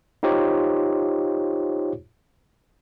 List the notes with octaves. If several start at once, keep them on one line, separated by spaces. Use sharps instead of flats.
D#4 F4 G4 C5 C#5